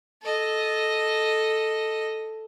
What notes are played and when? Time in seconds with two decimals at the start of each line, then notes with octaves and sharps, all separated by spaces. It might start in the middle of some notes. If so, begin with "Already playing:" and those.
0.22 A4 D#5